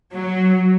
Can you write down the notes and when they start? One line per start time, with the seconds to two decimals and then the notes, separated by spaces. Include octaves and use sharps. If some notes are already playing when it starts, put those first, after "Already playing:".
0.13 F#3